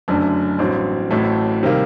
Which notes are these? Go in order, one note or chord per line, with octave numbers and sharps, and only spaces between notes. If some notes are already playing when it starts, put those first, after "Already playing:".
F#1 F#2 D3 A3 D4
A1 G2 F#3 C4
A1 A2 F#3 A3
C3 D#3 G3 A#3